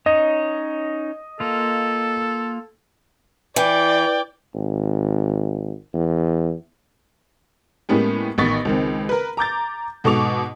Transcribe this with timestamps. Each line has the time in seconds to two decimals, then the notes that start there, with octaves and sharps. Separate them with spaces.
0.06 C#4 D#4 C#5 D#5
1.40 A#3 F4 A4
3.56 E3 D5 G5
4.55 G#1
5.94 E2
7.89 A2 G#3 A#3 B3 C#4 G4
8.38 A1 D#3 B3 C#6 A6
8.65 C#2 D#3 C4
9.09 A#4 B4
9.37 A#5 D6 G6 A6
10.04 G#2 B2 A4 C#6 D6 F7